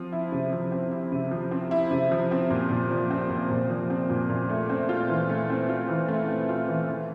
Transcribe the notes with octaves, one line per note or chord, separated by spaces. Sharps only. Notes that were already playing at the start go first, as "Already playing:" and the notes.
Already playing: F3 C4
E4
C3
F3
C4
E4
C3
F3
C4
E4
C3
F3
C4
A#2
A#2
F3
C4
A#2
A#2
F3
C4
A#2
A#2
A3
C4
F4
E3
A3
C4
F4
E3
A3
C4
F4
E3
E3